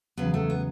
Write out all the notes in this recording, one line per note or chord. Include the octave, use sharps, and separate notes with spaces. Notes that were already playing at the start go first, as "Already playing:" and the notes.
E2 C#3 F#3 B3
A3
B3